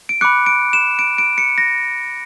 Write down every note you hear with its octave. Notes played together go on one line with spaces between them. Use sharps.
D7
B5 D6 F#6 C#7
D7
E7
D7
D7
C#7
A#6